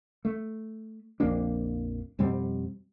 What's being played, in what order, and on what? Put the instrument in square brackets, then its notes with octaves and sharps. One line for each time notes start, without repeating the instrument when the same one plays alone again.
[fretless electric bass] A3
A#1 F2 A#3 D4
F2 B2 G3 C4